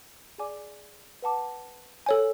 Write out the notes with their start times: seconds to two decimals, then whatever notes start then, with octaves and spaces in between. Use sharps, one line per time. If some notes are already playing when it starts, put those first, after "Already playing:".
0.38 G#4 D5 G#5 D6
1.22 B4 F#5 A5 D6
2.06 A4 C#5 G#5